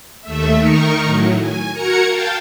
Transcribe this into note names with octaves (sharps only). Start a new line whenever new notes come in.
D#2 A3 E5
D#3 D#4 A#4 C#6
A2 F#3
G#5
F#4 A#4 A#5 G#6 C#7
F5 G5 A5